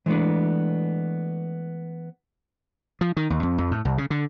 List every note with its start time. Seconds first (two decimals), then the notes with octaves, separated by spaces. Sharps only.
0.06 E3 G#3 A3 B3 D4
3.01 F3
3.17 D#3
3.30 D#2
3.43 F2
3.58 F2
3.71 A2
3.85 C2
3.98 C#3
4.10 D3